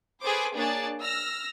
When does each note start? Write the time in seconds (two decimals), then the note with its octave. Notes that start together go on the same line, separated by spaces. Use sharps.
0.22 G#4 A4 B4 C5 D6
0.55 A#3 D4 G#4 C#5 D5 A5
1.01 E6 F6 A#6